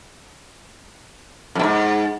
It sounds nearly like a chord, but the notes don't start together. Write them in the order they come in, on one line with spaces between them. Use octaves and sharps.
F2 B2 G#2